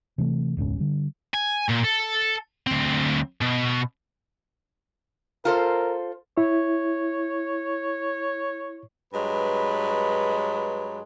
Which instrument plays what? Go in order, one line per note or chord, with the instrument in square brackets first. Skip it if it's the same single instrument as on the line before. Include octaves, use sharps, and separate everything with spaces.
[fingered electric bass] C3 E3 A3
E1 C#2 G#2 C#4
D3 G3
[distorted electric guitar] G#5
A#2
A4
D2 C4
B2
[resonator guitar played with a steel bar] F4 A4 C5 [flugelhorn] A#4
[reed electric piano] E4 [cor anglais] C#5
[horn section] G2 F#3 G#3 B4